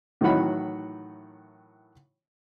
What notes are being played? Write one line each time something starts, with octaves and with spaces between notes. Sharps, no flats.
A2 D#3 E3 F#3 F#5 B5